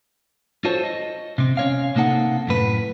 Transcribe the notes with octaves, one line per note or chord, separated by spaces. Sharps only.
F4 F#4 A4 C5 C#5
D#5
C3 C4
C#4 C#5 F5
C3 A#3 D#4 A4 F#5
F#2 A2 B4